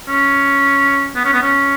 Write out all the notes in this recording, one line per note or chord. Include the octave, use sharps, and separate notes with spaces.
C#4
B3
C#4
B3
C#4